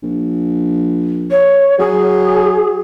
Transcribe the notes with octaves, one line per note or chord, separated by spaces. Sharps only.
A#1
C#5
F#3 G#4